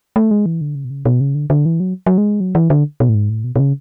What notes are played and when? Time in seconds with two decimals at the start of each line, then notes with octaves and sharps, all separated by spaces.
0.16 A3
0.31 G#3
0.46 E3
0.61 D3
0.75 C#3
0.85 B2
0.90 C#3
1.05 B2
1.21 C#3
1.35 D3
1.50 D3
1.66 E3
1.80 F#3
2.06 F#3
2.18 G#3
2.40 F#3
2.55 E3
2.70 D3
3.00 B2
3.09 A2
3.15 G#2
3.30 A2
3.44 B2
3.56 B2
3.59 C#3